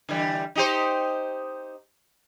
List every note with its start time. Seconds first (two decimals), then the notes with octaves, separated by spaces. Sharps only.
0.09 D3 E3 G3
0.55 D#4 G4 C5